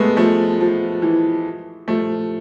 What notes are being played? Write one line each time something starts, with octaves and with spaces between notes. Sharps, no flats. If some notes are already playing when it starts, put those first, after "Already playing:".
Already playing: G#3 A3 B3
F3 A3
F3
E3
F3 A3